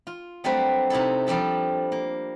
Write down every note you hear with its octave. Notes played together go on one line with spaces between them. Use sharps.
F4
F#3 G3 A3 C4 D4 B4
C3 D#4 E4 A4
F3 G3 D4 A4 A5
A#3